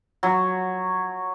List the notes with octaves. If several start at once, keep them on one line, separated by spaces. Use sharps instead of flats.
F#3